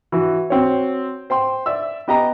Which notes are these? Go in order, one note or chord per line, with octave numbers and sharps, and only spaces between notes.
E3 F#4
C4 F#4 C#5
C5 G5 C6
D5 E5 E6
B3 G4 D#5 G5 A#5